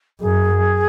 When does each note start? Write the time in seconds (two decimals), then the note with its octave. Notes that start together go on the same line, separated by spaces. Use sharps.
0.20 F#2 G#4